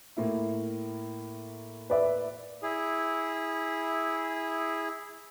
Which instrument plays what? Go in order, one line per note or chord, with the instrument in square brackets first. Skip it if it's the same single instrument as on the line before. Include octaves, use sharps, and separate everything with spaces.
[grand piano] A2 A#3 E4
[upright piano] B4 D5 E5
[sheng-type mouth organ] E4 G#4